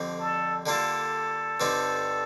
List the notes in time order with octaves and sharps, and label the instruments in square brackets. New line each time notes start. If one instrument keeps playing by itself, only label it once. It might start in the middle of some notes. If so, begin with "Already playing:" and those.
Already playing: [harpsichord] F2 D3 G3 C4
[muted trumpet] A4
[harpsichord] D3 G3 A#3 F4 [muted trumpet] A4
[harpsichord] G2 D3 G3 C4 D#4